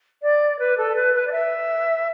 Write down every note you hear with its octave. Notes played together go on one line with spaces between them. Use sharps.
D5
B4
A4
B4
B4
D5
E5